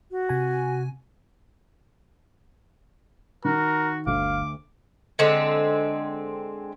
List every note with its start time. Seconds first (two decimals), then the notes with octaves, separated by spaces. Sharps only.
0.11 F#4
0.29 C3 G#5
3.45 D#3 F#4 A#4
4.07 G1 D2 F5 D6
5.19 D3 G#3 C4